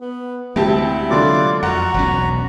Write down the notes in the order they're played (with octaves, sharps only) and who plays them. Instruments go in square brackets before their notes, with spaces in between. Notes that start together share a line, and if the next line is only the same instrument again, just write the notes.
[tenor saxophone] B3
[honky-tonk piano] D2 G4 A5 [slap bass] G#3 C4 [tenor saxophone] E4
[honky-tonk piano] D3 F#3 [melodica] F4 D5 D6
[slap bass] F2 [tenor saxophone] F#4 [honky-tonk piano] F#5 [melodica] A#5
[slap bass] E1 B1 C#4